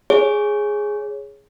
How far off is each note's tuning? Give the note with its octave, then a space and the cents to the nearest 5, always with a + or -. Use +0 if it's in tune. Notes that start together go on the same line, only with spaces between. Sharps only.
G#4 +0 C#5 +0